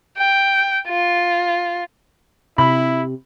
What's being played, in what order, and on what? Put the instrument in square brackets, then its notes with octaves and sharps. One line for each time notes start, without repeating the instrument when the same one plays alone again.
[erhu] G5
F4
[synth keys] C3 [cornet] E4 [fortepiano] B5